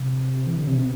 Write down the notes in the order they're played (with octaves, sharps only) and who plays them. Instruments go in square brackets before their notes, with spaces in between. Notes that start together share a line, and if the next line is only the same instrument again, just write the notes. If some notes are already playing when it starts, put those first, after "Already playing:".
Already playing: [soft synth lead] C3
E3
D3
C3
B2